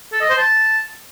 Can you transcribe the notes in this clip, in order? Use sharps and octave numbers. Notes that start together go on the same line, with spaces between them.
A4
D#5
C5
A5